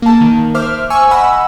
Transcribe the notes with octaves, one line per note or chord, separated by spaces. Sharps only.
A#3 A5
D#3
C5 E5 D6 F6
G#5 C#6 E6
D#5 F#5 B5 E6